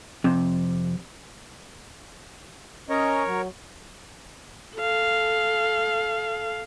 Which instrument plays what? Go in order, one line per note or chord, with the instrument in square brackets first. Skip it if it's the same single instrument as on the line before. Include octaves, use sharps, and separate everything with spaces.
[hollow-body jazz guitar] F2 C3
[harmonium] C#4 D#5 A#5 [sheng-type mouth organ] A#4 C#5
[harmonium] F#3
[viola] A4 F5